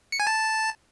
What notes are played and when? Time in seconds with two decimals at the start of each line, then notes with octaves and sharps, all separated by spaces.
0.12 C#7
0.20 G#5
0.27 A5